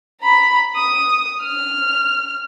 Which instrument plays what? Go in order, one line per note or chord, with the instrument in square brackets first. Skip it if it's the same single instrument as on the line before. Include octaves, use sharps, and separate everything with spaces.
[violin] A#5 B5
D#6
F6